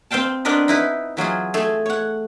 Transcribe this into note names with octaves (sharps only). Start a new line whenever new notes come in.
C4 C5 F5 G5 A5
B3 C4 D4 A#4 B4 D#5
D#4 E4 B4
E3 F#3 F4 G#4
A3 G#4 A4
C#5 F#5